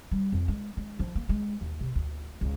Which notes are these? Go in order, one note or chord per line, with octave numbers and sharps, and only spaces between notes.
G3
F2
G#3
G#3
F3
A#3
G#3
D#2
C3
D2
C#2